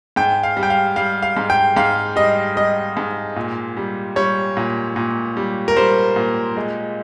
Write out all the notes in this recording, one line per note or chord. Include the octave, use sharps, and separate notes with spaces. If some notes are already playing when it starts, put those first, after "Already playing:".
G#2 G5
F5
G3
G5
F5
G3 F5
F5
G#2
G5
G#2 F5
G3 D#5
G3 D#5
G#2
A#2
G3
G3 C#5
A#2
A#2
G3
A#4
G3 C5
A#2
G#3